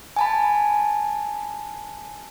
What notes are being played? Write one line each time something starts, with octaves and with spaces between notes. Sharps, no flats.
G#5 A5 B5